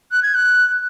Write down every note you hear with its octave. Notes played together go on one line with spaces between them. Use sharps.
F#6
G#6
F#6